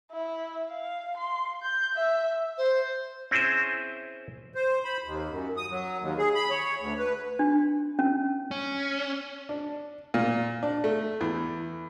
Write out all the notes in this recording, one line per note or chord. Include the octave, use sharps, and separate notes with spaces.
E4
F5
C6
G6
E5
C5
C4 C#4 E4 G#4 C5
C5
B5
D#2
F#2
D#6
F#3
D#2
G#4
B5
C#5
D2
B4
D4
C#4
C#4
D4
A#2
D4
A3
E2